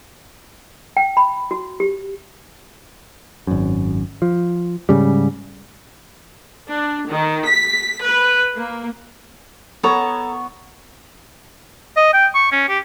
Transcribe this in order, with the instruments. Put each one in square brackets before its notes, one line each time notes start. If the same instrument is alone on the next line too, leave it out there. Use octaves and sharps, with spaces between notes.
[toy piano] G5
B5
F#4
G4
[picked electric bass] G#1 F#2
F3
G#2 C#3 G3
[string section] D4
D#3
B6
B4
A#3
[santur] B3 C#5 C#6 [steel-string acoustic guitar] A4 A#5
[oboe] D#5
G5
C#6
C#4
G4